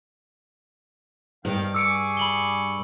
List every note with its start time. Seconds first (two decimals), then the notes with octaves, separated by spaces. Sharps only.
1.45 G2 D#3 F5 G5
1.75 G#4 C#6 D6 E6 C#7 D7
2.17 B5 F#7 G7